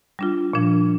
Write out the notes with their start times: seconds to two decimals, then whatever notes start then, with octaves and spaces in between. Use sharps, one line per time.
0.19 G3 D4 F4
0.53 A#2 F3 D4